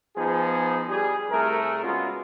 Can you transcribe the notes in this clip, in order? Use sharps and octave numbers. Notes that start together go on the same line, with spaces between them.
F3 B3 D#4 G#4
G3 G#4
C2 A3 G#4 A#4
C#3 G#3 B3 F4 F#4